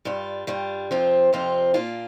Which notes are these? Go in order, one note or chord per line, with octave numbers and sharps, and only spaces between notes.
G2 G3 D4 F4
G2 G3 D4 F4
F2 C3 F3 C4 F4
F2 C3 F3 C4 F4
A#2 A#3 D4 F4